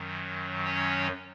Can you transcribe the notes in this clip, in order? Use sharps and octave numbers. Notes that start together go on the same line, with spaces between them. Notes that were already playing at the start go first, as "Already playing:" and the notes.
Already playing: F#2 D#3 F#3
C#4 C#5